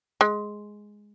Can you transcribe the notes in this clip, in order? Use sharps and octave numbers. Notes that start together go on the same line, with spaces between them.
G#3